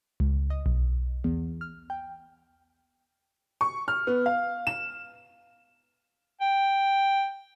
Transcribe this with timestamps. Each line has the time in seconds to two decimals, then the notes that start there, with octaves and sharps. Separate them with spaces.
0.20 C#2
0.50 D#5
0.66 B1
1.24 E2
1.61 F6
1.90 G5
3.61 C#6
3.88 F6
4.07 B3
4.26 F5
4.67 E7
6.41 G5